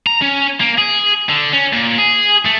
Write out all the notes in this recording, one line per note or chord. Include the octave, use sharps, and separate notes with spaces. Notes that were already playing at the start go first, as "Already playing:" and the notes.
A#5
C#4
A#3
G#4
D3
C#4
A#2
G#4
A3